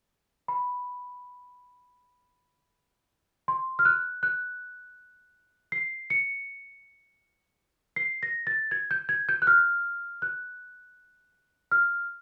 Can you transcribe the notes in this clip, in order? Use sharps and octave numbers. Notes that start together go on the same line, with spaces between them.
B5
C6
F6
F#6
F#6
C7
C#7
C7
A#6
A6
G#6
G6
G#6
G6
F#6
F6
F#6
F6